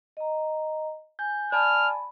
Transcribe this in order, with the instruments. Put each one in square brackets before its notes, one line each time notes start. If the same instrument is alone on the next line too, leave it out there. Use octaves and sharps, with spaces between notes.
[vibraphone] D#5 A#5
[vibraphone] G#5 [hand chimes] G6
[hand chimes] D5 G#5 A5 [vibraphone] B5 [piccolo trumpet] F6